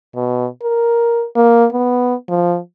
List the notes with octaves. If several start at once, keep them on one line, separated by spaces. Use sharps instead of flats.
B2
A#4
A#3
B3
F3